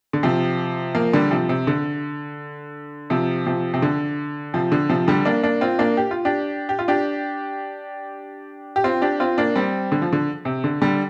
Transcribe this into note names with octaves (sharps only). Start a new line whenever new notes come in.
D3
C3 F3
F3 A#3
D3 G3
C3 F3
C3
D3
C3 F3
C3 F3
C3
D3
C3 F3
D3
C3 F3
D3 G3
A#3 D4
A#3 D4
C4 F4
A#3 D4
G4
F4
D4 G4
G4
F4
D4 G4
G4
C4 F4
D4 G4
C4 F4
A#3 D4
G3 C4
D3
F3
D3
C3
D3
D3 G3